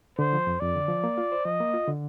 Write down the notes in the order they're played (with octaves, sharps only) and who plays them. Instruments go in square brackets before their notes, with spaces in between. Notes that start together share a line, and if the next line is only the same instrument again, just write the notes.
[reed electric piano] D3 [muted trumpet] C5
[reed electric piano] F3
F2
[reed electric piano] F2 [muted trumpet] D5
[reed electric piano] D3
F3
A#3
F4
C5
[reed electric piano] F3 [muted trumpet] D#5
[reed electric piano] A#3
F4
D3